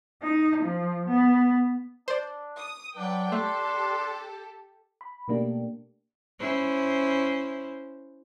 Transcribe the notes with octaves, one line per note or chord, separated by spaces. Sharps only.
D#4
F3
B3
D4 C5 D5
D#6
F#3 D4 B4 F#5 G5
A3 G4 A4 C6
B5
B2 A3 A#3 D4 G4
C#4 E4 C5